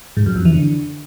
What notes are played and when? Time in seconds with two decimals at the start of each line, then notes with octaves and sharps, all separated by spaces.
0.17 G#2
0.26 F#2
0.36 F2
0.45 E3
0.55 D3